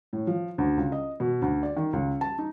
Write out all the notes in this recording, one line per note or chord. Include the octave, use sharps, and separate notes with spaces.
A2
F3
D2
C#2
D#5
B2
D2
D5
D#3
C#2
A5
D#4